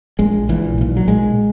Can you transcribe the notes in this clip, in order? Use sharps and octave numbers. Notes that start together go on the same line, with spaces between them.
A#1 A#2 G#3
A#1 A#2 E3
B1 A#2
F#3
B1 A#2 G#3